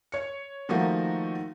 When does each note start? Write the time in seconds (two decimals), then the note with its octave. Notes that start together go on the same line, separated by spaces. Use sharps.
0.12 C#5 C#7
0.69 D#3 F3 A3 A#3 F#4